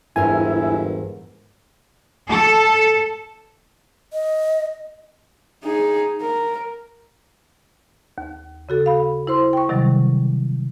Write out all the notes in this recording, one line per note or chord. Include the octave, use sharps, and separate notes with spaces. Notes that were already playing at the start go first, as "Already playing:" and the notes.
G1 E2 G#2 E4 A#4 G#5
A4
D#5
D#4 G#4
A#4
D#2
C#3 F#4 A4
F5 B5
E4 C5 C6
G5 C#6
C3 D#3 F#3 G3